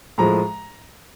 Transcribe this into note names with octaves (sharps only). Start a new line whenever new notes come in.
A2 F3 G#3 A#5